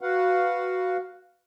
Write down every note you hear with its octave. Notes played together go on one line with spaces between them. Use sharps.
F#4 B4 F5 F#5